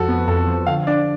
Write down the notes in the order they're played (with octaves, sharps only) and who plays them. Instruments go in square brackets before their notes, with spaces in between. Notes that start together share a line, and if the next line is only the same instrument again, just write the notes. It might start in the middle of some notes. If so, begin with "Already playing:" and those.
Already playing: [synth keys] F2 F3 [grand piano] F#4 A4
[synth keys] B3
[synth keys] F2 [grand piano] A4
[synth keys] F3
[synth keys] D3 [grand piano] F5
[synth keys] D4 [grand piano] D5